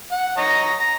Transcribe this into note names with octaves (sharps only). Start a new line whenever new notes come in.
F#5
C#5 D#5 A#5
A#5